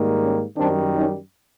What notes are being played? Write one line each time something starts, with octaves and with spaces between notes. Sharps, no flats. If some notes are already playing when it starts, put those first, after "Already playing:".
Already playing: G#2 D#3 G3 A#3
C#4
F#2 D#3 G3 C4 D4
C#4 D#4